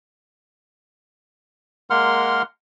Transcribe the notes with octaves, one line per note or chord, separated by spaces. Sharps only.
G#3 A#3 A#4 F#5 C6 F6